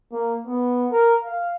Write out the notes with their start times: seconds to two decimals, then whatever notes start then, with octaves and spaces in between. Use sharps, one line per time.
0.12 A#3
0.47 B3
0.92 A#4
1.24 F5